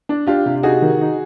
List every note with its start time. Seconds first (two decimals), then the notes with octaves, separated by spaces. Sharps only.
0.09 D4
0.27 D4 F4 G4
0.46 C3
0.63 D#4 F#4 G#4
0.82 D#3
1.01 D#4